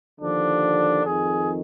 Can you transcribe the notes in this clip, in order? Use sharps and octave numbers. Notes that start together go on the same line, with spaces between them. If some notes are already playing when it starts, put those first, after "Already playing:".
D#2 D3 F3 D4
F2 D#3 G#4